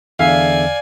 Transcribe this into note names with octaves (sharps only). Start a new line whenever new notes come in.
E2 D3 D5 E5 F5 G#5